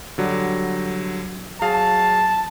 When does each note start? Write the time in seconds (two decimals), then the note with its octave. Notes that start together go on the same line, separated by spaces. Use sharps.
0.18 D3 F#3 G3
1.62 F#3 G#4 F5 A5